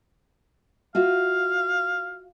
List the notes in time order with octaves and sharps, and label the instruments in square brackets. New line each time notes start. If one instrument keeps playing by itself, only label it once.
[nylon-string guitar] F4 F#4 E5 [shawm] F5